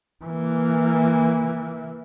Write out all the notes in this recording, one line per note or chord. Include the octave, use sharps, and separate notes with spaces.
E3 A#3